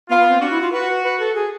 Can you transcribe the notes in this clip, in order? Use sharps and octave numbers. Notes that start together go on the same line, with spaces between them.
B3 F4
B3
C4
D4 F#4
E4
F4
F#4 B4
B4
A4
G#4